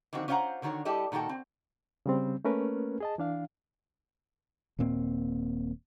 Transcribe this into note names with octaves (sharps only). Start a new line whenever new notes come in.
D3 D#3 F3 C4 F#4
C#4 F4 C5 E5 F#5 A#5
D3 D#3 F#4 A4 C#5
G3 E4 G4 A4 D5 D#5
A#2 D#3 F#4 A4 G5
C4
C#3 G3 C4
A3 A#3 C#4 A#4 B4
G#4 D#5 A5
E3 D4 F5
D#1 A#2 A#3 C4